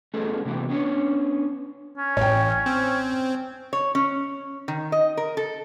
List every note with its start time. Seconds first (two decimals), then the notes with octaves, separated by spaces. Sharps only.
0.14 A3 B3 C#4 D#4 G#4 A4
0.45 C3 E3 B3 G4
0.69 B3 C#4 D4 C#5
1.98 C#4
2.17 A1 C#5 G5
2.66 C4
3.73 C#5
3.95 C#4
4.68 D#3
4.92 D#5
5.17 A#4
5.37 A4